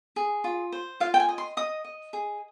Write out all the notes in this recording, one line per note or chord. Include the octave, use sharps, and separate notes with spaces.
G#4
F4
C5
F4 F5
G5
G#5
D#5
C6
D#5 D#6
D#5
G#4